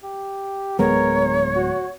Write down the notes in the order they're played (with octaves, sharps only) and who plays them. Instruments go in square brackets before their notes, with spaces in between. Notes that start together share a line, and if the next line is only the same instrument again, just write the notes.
[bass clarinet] G4
[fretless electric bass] D1 G#3 B3 [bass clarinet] A#4 [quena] C#5
[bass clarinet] F#4